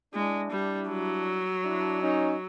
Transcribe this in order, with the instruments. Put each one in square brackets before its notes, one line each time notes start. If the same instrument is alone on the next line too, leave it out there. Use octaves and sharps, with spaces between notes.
[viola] G#3 [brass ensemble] D4 E4
[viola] G3
F#3
[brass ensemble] D4 E4
C#4 D#4